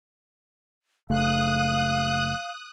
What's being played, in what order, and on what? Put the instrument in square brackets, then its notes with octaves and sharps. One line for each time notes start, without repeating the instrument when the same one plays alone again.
[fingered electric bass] F#1 C#3 A3 [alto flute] F5 [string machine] D#6 F#6